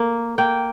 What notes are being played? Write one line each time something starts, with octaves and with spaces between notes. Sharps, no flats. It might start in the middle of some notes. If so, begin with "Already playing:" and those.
Already playing: A#3
A#3 G5